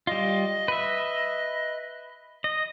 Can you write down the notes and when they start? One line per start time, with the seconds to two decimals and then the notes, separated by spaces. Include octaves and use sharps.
0.07 G3 F4 D#5
0.68 B4 E5
2.44 D#5